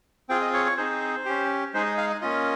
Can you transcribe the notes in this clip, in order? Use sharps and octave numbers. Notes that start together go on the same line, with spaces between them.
C4 F4 G#4 G5
D#5
C#5
C#5
C4 D#4 G#4 C5
C#4 G4
G#3 D#4 G#4 C5
D#5
F5
D#5
A#3 C#4 F4 D#5